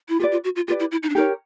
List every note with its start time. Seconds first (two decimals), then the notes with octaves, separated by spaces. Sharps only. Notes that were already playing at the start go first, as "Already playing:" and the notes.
0.09 E4
0.20 F4 G4 B4 D5
0.32 F4
0.44 F#4
0.56 F4
0.68 F4 G4 B4 D5
0.80 E4
0.91 E4
1.03 D#4
1.09 D4
1.15 D#4 G4 A#4 C#5